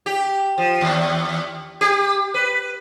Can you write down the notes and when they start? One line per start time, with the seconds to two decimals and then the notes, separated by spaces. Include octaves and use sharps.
0.06 G4
0.58 F3
0.81 D#2
1.81 G4
2.34 B4